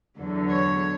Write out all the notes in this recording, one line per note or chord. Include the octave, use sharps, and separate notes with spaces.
E2 D3 F#3
C#5